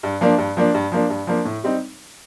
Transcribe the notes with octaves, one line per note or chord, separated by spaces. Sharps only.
G2
F3 A#3 D4
G2
F3 A#3 D4
G2
F3 A#3 D4
G2
F3 A#3 D4
A2
G3 C4 D#4